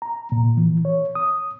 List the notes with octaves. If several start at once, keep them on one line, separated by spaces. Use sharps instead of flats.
A#5
A#2
E3
C#5
D#6